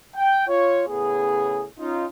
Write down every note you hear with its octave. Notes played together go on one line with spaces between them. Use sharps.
G5
F4 C#5
A2 C#3 B3 G#4
C#4 D#4 F4